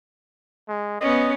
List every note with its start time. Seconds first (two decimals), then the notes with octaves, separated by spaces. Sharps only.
0.68 G#3
1.01 B3 C#4 D#5